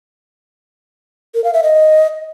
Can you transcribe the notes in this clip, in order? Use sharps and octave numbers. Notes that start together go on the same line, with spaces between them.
A#4
F5
E5
D#5